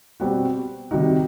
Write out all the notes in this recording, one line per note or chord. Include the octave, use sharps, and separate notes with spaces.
B2 G3 C4 F#4
C3 D#3 G3 D#4 F#4